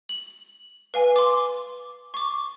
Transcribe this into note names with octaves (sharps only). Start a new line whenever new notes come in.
F#7
B4 F5 G#5
C6 D6
C#6 D6